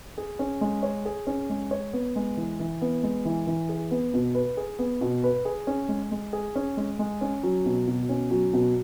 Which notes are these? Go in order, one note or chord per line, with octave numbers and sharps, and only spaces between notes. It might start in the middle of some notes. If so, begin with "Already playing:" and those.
G#4
C#4
G#3
C#5
G#4
C#4
G#3
C#5
B3
G#3
E3
E3
B3
G#3
E3
E3
G#4
B3
B2
B4
G#4
B3
B2
B4
G#4
C#4
G#3
G#3
G#4
C#4
G#3
G#3
C#4
F#3
B2
B2
C#4
F#3
B2